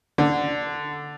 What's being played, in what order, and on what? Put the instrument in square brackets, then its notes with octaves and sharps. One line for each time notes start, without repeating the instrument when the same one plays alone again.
[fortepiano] D3